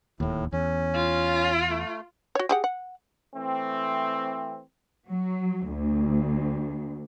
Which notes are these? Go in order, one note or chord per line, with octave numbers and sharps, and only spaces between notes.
D1 D#2 A2
E2 C#4
F4
A3
F#4 C#5
G4 G#4 F#5
F#5
E3 A3 C4
F#3
D2